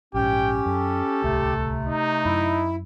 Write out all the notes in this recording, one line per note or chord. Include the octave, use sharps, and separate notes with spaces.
A#1 G#2 C#4 G4 G5
F#2 A4
D1 C2 C3 A3
D#4
F#2 E4